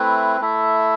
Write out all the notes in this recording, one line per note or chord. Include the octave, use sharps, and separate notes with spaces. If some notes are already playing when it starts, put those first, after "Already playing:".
Already playing: A3 C4 E4 B4
A3 E4 A4 E5